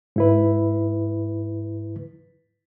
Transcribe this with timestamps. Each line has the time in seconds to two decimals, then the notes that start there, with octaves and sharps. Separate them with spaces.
0.16 G#2 E4 B4